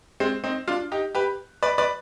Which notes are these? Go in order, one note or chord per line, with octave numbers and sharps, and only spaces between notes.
G#3 C4
C4 D#4
D4 F4
D#4 G4
G4 B4
B4 D5
B4 D5